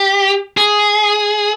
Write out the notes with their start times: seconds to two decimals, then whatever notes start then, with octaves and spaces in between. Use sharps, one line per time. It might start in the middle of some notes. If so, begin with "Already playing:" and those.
Already playing: G4
0.57 G#4